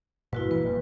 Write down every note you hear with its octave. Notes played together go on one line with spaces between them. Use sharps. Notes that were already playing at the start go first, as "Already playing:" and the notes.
G2 A#2 E4 F#4 B4
E3 A#3 B4
F1 G2